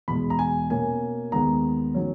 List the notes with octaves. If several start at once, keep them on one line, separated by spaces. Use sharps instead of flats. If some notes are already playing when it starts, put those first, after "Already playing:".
E2 B2 G#3 B5
A#5
G#5
B2 A#3 C#4 G#5
D#2 D#3 G#3 B3 A#5
D#3 F#3 C#4